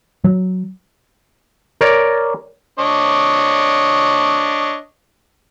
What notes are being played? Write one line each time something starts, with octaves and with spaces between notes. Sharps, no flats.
F#3
A#4 C#5 D5
D4 C#5 D#5